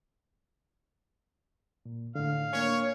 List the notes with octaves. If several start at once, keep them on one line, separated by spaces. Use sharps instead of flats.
A#2
A2 D3 F5
A#3 D4 C#5 G#5